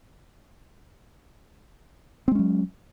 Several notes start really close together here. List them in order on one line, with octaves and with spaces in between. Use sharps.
C4 G#3 C#4 F#3